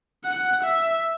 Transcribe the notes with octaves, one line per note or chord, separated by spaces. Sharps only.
F#5
E5